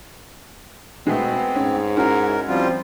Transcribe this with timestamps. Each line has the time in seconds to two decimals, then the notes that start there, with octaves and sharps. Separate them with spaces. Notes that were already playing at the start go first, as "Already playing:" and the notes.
1.07 B2 G#3 A3 B3 C4
1.56 G#2 C#4
1.97 C#4 E4 F#4 A#4
2.48 F3 G3 C4 F4